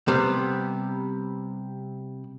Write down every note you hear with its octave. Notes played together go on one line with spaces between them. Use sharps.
C3 G3 B3